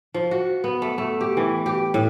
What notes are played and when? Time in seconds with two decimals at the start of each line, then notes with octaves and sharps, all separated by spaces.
0.14 F3
0.31 F#4
0.64 B3
0.82 A3
0.98 A3
1.21 G4
1.37 E3
1.66 G4
1.94 A2